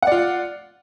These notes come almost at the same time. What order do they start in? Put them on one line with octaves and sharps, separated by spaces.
F#5 D5 F4